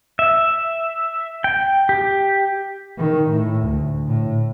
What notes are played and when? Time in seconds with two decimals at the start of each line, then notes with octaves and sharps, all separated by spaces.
0.19 E5
1.44 G5
1.89 G4
2.99 D#3
3.30 A2
3.62 D2
4.08 A2